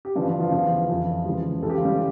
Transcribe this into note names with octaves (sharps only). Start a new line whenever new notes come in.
G4
G2 E3 F3 F4
F3 F4
F3 F4
E2 E3 F3 F4
F2 E3
C#2 C#3 E3
C#2 C#3 E3 A4
G4
F4
G3 G4